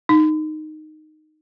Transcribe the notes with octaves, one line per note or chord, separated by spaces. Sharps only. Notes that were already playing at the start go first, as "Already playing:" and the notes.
D#4